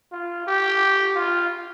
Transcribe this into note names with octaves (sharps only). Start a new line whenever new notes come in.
F4
G4
F4